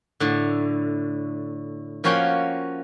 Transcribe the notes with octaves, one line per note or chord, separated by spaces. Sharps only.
A2 D3
F3 A#3 C#4 F#4 C#5 G5